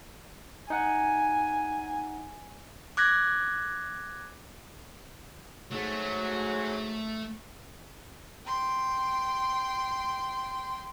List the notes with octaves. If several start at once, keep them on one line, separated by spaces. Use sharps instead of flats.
D#4 F#5 G#5
D6 F#6 G#6 A#6
G#2 F#3 A3
G5 C6